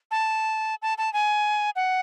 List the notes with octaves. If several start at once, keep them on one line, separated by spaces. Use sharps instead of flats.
A5
A5
A5
G#5
F#5